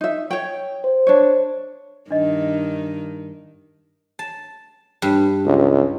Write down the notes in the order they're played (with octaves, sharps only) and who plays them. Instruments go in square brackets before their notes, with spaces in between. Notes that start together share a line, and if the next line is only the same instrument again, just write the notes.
[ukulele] D#4 E5
C#5 G5
[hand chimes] C5
[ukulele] D4 C#5
[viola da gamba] G2 D#3 [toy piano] D4 D#5
[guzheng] A5
G2
[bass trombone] C#2